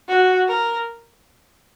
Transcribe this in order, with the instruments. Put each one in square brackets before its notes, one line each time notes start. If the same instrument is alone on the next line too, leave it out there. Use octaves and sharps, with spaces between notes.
[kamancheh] F#4
A#4